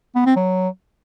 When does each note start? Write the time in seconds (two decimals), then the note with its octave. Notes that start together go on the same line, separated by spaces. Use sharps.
0.15 B3
0.26 C4
0.36 F#3